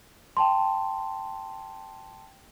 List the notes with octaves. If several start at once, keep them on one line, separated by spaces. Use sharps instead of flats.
G5 A5 C6